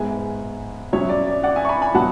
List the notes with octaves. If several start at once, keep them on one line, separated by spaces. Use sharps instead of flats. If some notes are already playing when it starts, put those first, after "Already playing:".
Already playing: G#2 G#3 B3 E5 G#5
B2 F#3 C#4 C#5 E5
D5
D5
D5 F#5
E5 G#5
C#6
G#5 B5
G#5 B5
B2 F#3 B3 F#5 A5